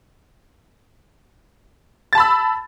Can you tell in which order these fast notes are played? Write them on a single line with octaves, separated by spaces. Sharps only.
A6 A5 B5 E6